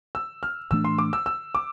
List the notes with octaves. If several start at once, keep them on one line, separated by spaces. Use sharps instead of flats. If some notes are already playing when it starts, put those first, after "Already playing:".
E6
F6
A2 E3 A3 D4 E6
C6
D6
E6
E6
D6